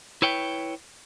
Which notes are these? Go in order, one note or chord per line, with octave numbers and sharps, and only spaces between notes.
E4 B4 C#5 G5